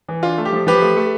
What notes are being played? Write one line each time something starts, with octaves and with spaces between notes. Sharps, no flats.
E3
D4 F4
A3
G4
F3
F3 G4 B4
A3
A3